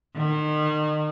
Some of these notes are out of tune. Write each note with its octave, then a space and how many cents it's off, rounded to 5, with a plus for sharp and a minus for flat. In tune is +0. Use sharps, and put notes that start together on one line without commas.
D#3 -35